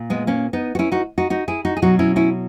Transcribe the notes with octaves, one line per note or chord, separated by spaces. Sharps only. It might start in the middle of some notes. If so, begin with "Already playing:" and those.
Already playing: A#2
G#3 B3
A#3 C#4
B3 D#4
F#4
C#4 E4
D#4 F#4
D#4 F#4
D#4 F#4
E4 G#4
D#4 F#4
G#4
B2 F#3 D#4 F#4
C#4 E4
C#4 E4